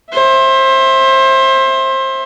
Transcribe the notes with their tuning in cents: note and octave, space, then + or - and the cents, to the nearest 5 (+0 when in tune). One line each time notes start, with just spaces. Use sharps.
C5 +25 E5 +0